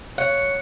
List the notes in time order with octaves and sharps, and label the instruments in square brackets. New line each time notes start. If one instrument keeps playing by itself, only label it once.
[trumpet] C#5 [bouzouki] F#5